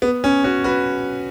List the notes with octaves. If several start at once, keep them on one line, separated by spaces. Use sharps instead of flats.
B3
C#4
C#4 F#4
F#4 B4